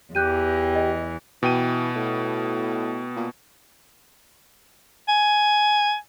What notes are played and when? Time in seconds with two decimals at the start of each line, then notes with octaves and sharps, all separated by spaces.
0.15 E2 E3 G4 F#6 G6 D#7
0.75 D#5
1.43 B2 E3 G5 D#7
1.96 A2
3.16 A#2
5.08 G#5